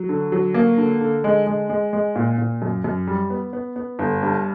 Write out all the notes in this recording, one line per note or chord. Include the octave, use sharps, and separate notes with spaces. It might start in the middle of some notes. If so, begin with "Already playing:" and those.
Already playing: F#3
D3
F#3
A#3
D3
D3
G#3
G#3
G#3
G#3
A#2
A#2
F#2
F#2
G3
B3
B3
B3
G1
G2